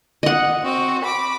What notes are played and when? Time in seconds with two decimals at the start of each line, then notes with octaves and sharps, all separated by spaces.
0.23 D#5 F#5
0.63 C4 F#4
1.03 B5 D6